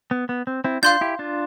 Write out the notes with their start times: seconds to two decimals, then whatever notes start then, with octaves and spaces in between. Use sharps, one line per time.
0.11 B3
0.29 B3
0.47 C4
0.64 C4 E4
0.83 D4 F4 F5 C6 G6
1.01 E4 G4
1.19 D4 F4